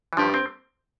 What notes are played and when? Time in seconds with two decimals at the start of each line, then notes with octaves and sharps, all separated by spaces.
0.13 E3
0.17 G2 F3
0.34 C4